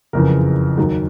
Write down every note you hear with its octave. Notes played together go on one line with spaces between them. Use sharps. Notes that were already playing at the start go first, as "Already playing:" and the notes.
F#1 F2 C#3 E3 A#4
D#2 D#3 F#3